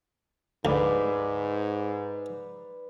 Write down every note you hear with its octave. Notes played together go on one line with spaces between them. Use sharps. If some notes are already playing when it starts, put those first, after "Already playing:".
D2 G#2 B4 D5 D#6